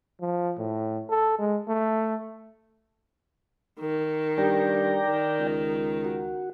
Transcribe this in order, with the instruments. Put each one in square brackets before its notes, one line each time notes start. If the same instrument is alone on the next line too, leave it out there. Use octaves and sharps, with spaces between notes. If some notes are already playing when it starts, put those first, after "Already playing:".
[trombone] F3
A2
A4
G#3
A3
[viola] D#3
[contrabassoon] G2 [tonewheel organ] D5 G5 A#5
[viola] D#3
[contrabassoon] C#2
[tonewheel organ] F#4